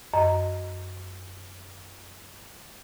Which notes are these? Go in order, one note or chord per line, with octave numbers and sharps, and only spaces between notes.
F#2 D#5